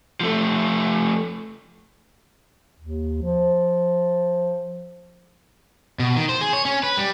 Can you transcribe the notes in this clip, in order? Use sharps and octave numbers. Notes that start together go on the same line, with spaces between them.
F3 A3
D#2
F3
B2
D#3
C5
G#4
C#5
C#4
B4
G3